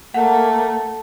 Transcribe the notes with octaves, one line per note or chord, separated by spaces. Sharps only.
A3 A#3 F#5